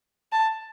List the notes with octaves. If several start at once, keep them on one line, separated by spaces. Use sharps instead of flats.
A5